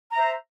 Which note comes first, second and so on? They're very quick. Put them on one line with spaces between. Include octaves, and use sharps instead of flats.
A#5 E5 C5